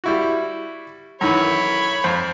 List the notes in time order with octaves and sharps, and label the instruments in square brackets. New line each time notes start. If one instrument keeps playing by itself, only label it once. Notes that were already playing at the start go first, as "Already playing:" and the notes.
[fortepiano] G3 E4 F#4
[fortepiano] F#2 D#3 E3 [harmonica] C#5 B5
[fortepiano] F2 C5